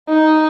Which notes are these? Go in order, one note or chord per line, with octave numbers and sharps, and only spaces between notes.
D#4